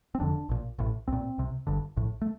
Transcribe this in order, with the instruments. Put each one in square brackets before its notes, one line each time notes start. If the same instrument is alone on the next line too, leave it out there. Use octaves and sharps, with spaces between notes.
[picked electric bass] C4
F1 F2 D3 D4
A#1 A#2
A1 A2
C2 A#2 C4
C2 C3
G1 G2 D3
A#1 A2
A3